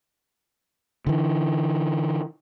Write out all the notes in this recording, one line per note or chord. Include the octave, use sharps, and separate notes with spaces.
D3 E3